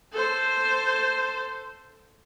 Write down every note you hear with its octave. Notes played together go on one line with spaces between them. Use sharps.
A4 C5